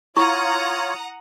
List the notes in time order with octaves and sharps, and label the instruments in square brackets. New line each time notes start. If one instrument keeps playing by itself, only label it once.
[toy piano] E4 C#6 [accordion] F4 C#5 [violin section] F#5 A#5 D#6